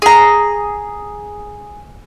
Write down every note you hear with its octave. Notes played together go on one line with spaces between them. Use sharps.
G#4 A#5